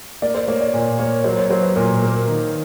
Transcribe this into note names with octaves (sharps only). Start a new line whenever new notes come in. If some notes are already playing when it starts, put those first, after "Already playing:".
A#3 D5
C5
A#3 C#5
D5
A#2
A#3 C#5
F#3 C5
C#5
F#3 C5
B4
A#2 A#4
A#3
D#3